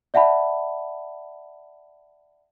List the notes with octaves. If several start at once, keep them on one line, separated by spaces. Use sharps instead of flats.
D5 E5 F#5 A5 B5